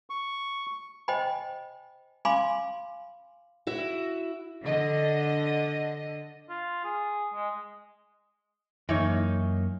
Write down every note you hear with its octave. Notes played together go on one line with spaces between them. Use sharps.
C#6
C5 D#5 G5 G#5 B5
F5 G#5 B5 C6 D6
E4 F#4 E5
D3 D#5
F4
G#4
G#3
F#2 E3 A#3 D#4 C#5